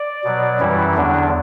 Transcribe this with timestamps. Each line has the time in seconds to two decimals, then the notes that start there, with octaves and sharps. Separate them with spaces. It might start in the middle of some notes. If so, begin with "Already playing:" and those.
Already playing: D5
0.24 B2 F#3
0.60 F#2 E3 G3 E4
0.95 E2 D3 F#3 D4